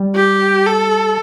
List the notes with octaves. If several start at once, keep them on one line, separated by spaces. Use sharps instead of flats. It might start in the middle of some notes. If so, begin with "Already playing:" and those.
Already playing: G3
G4
A4